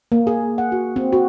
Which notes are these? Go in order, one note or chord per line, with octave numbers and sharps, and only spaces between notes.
A#3
G#4
F#5
F#4
C4
F#4